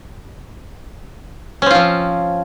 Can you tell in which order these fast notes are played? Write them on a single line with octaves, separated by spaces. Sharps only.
C#4 C4 F4 F3